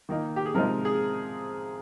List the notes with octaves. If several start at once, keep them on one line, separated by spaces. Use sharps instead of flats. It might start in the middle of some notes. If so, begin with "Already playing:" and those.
D#3 A#3 D#4
G4
G#4
C3 F3 G#3 D#4 A#4
G#4